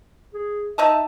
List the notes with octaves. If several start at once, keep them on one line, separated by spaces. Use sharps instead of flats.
G#4
D#4 D#5 E5 A5